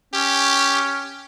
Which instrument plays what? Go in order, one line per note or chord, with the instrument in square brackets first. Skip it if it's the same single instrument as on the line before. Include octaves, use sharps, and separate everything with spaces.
[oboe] C#4 [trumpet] G4